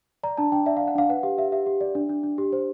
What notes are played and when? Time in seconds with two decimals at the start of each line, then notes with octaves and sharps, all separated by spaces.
0.23 D5 A#5
0.37 D4 A5
0.52 D4 G5
0.66 D5 E5
0.77 F5
0.80 D5
0.88 F#5
0.95 D4 F5
1.09 B4 F#5
1.23 G4 F5
1.38 G4 E5
1.52 G4 E5
1.66 G4
1.81 D5
1.95 D4
2.09 D4
2.23 D4
2.38 G4
2.53 C5